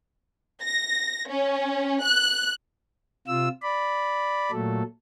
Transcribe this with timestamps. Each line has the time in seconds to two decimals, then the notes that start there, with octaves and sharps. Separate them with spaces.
0.62 A#6
1.28 C#4
2.03 F#6
3.27 C3 F4 E6
3.62 D5 B5
4.52 A#2 F#3 A3 A4